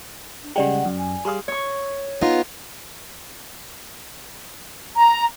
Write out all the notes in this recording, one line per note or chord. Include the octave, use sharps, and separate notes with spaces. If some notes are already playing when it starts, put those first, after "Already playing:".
D4
C#3 G3 G#3 G4 D5 F#5 G5
F#2
G#5
G3 G#4 F5 C6 D#6
C#5 C#6
B3 D#4 F4
A#5